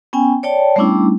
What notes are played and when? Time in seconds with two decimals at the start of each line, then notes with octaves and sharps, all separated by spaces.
0.13 B3 C#4 G5 G#5
0.43 C#5 D5 G5 A5
0.76 G3 A3 B3 C#4 D4 E4